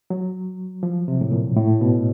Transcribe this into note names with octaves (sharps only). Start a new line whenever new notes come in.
F#3
F3
C3
A2
A#2
A2
B2